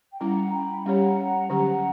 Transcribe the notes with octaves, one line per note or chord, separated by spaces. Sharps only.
G5
G3 C#4 E4 F#5 A#5
G5 B5
G3 C#4 G4 C#5 F#5 A#5
D3 F#3 C#4 G4